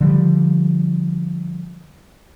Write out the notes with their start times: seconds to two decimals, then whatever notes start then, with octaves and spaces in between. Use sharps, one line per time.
0.01 D3 F3 G3